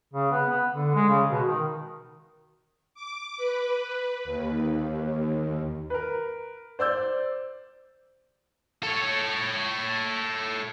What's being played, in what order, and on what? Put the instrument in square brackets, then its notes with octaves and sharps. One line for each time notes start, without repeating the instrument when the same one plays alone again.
[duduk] C#3
B3
B3
D3
G#3
C#3
B2
D#3
[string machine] D6
B4
D#2
[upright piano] A#4 B4
C5 D5 E6 G6
[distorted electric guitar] A4 C#5